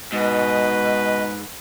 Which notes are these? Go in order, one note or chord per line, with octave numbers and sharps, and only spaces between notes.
G#2 B2 B4 D#5